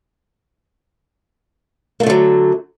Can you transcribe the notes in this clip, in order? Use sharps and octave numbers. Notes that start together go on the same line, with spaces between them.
D3 F#3 A3 A#3